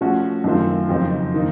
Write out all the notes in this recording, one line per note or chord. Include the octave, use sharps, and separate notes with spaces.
F3 A3 C#4 F#4
F#2 D#3 A3 C4 F4
F2 C#3 F#3 C4 D#4
D#3 A#3 D#4